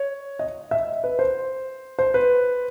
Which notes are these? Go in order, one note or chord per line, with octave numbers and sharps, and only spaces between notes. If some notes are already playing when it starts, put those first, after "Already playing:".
Already playing: C#5
D#5
E5
B4
C5
C5
B4